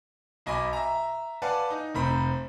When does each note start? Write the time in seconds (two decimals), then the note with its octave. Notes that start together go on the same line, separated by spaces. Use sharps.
0.46 B1 D#5 G#5 B5 D6
0.73 E5 A#5
1.42 B4 D5 F5 F#5 G#5 A5
1.70 D#4
1.95 F1 C4 A#5 B5